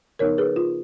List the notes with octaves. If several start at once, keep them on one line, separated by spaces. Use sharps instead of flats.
C#3 F3 B3 D#4 A#4 C#5
G#4 B4
F4